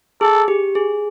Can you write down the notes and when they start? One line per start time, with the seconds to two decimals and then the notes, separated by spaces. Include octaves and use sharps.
0.21 G#4 A4
0.48 G4
0.75 G#4